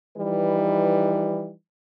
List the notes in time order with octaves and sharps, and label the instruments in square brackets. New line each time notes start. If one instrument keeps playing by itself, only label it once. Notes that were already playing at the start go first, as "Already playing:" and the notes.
[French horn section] E3 F3 G3 D#4 B4